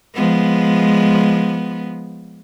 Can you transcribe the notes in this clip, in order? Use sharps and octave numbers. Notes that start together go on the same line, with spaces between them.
F3 G#3 B3